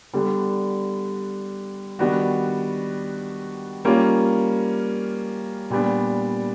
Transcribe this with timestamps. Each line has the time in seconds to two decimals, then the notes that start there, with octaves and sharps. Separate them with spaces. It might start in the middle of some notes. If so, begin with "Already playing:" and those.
0.13 D3 G3 B3
1.99 D#3 G3 B3 D4 F#4
3.85 G3 A#3 C#4 F4
5.70 A#2 G3 B3 D4